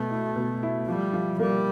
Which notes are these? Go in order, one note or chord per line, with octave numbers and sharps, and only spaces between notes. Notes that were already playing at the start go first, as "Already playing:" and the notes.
Already playing: B2 A3 B3
E4
B2
E4
F3 G3
F3
G3 A#3